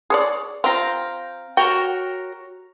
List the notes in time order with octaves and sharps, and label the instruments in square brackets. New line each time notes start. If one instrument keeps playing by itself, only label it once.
[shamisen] G#4 C#5 D5
[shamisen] C4 F4 [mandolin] F5 G5 A#5
[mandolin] F#4 A#4 C#5 [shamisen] G5